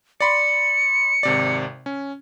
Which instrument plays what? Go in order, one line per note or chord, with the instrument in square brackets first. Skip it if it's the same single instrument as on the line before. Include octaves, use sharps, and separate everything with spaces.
[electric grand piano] D5 B5 C6 [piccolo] C#7
[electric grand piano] G#1 C3 D5
C#4